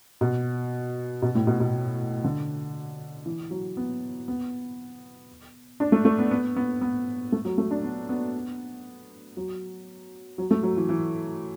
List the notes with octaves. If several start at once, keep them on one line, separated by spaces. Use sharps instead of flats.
B2
B2
A2
B2
B2
D3
E3
F#3
B3
B3
D4
A3
A3
B3
B3
B3
B3
A3
F#3
A3
D4
B3
B3
F#3
F#3
A3
F#3
E3
E3